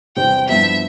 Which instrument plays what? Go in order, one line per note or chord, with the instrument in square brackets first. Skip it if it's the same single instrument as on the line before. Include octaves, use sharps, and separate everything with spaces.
[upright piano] E2 C3 E3 G3 C4 [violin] G5
[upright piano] G2 F3 B3 E4 [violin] E5